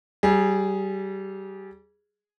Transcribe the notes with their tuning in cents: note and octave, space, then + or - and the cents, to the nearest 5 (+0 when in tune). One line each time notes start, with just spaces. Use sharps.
G3 -25 G#4 +0